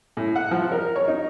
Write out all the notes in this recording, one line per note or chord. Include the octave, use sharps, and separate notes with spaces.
A2
F#5
F3
A#4
C#5
D#4